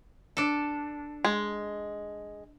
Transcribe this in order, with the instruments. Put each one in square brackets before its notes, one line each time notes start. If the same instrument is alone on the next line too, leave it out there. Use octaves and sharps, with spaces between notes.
[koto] D4 A4
[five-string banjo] G#3